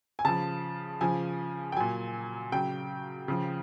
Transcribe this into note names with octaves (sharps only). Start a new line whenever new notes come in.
G#5
C#3 F3 A5
C#3 F3 G#5
G5
A#2 F#3 G#5
C#3 F#3 G5
C#3 F3